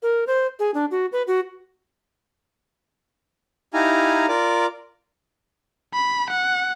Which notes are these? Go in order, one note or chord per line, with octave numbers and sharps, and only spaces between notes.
A#4
C5
G#4
D4
F#4
B4
F#4
D#4 E4 G4 F5 G#5 A#5
F4 A#4 D5 D6
B5
F#5